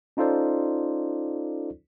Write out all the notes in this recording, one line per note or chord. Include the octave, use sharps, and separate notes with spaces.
C#4 D#4 F4 A4 C5 D5